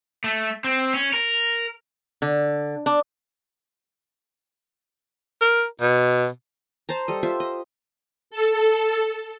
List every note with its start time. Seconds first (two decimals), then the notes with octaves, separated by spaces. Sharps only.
0.24 A3
0.64 C4
0.94 C#4
1.13 A#4
2.22 D3
2.86 D4
5.41 A#4
5.81 B2
6.89 C5 A5 A#5
7.08 G3 A4 D#5
7.23 F4 G4 C5 E5
7.40 D#5
8.31 A4